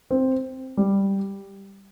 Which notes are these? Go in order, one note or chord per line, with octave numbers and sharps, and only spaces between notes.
C4
G3